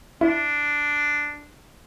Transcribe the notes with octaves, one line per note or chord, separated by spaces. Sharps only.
D4 E4